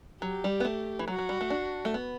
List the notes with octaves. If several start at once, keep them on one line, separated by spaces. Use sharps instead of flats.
F#3 G4
G3
B3
A3
E3
F#3 F#4
F#3
G3
A3
D4
A3
B3